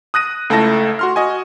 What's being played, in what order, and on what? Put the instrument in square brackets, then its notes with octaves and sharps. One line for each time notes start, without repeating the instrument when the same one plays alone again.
[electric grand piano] D#6 F#6 A#6 D#7
C#2 A3 E4 A5 A#6
F#4 C6 F6
F#4 D#5 G#5